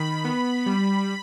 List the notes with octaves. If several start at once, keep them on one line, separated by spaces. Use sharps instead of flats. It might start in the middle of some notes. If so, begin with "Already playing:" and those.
Already playing: D#3 B5
B3
G3